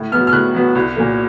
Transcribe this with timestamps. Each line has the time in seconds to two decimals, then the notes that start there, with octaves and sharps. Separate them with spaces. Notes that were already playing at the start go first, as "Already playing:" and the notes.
Already playing: A2
0.12 F#3 B3 F6
0.27 F6
0.33 A2 F#6
0.55 F#3 B3
0.75 C2
0.97 A#2 F#3 A#3